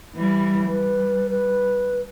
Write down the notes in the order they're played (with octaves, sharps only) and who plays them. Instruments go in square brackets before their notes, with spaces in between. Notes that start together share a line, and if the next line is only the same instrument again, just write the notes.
[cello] E3 G3
[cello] G3 [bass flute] B4
[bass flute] B4